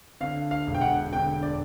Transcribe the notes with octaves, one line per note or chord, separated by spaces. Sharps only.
D3 F5
F5
E1
G5
F#5
D3 G5
D5